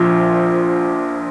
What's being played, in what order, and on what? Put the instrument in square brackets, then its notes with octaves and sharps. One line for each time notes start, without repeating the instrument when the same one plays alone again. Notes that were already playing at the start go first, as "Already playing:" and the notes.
Already playing: [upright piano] A#1 A#2 F3